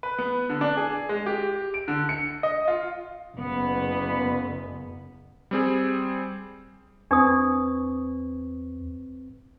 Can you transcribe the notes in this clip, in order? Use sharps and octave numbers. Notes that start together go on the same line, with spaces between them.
B4
B3
D3
D4
G#4
G#3
G4
D7
D3
C#7
D#5
F4
F#1 B3
G3 C4 G#4
E2 C4 D4 B4 C#6 D#6